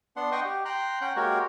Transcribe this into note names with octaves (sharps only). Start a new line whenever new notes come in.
B3 D4 F#5 C6
D#5 F#5 G5 C6 C#6 D#6
G4
G5 A#5 C6 F#6
C#4 F#5 G5 F#6
G#3 A#3 F#4 G4 A#4 C#5